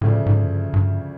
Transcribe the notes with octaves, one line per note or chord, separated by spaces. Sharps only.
D2 A2 C#3 F3 A3 D4
G#2
F#2
G2
G2